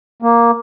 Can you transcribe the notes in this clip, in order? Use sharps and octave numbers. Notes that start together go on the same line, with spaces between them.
A#3